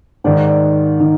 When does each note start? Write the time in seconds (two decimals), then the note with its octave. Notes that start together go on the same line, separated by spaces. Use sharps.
0.24 G#2 D#3 D5
0.47 D5
1.00 D#3